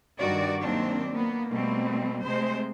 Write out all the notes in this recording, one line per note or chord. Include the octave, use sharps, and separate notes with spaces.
G2 D#3 F#4 D5
D#2 D#3 F#3 A#3 C4 D4
A#3 B3
B2 G3 A3 A#3 C4
C3 G#3 A3 C5